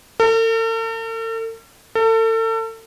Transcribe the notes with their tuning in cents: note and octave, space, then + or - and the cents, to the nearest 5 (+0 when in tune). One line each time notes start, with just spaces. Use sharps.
A4 +45
A4 +35